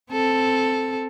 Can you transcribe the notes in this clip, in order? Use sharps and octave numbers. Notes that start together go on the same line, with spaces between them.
C4 A4